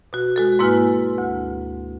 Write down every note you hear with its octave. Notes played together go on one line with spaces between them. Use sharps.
B2 F#4
G#3 F#4 A4
G#2 A#3 E4 B4 G#5 F6
D2